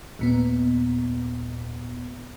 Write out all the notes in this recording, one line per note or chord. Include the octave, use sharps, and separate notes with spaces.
D#2 A#2 B3